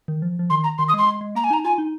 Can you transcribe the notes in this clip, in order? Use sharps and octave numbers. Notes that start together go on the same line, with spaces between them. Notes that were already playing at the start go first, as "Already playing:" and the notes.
D#3
F3
F3
D#3 C6
A#5
D#3 C6
D#6
G#3
C6
G#3
G#3
A#3 A#5
G#5
D#4 A#5
F4 G#5
D#4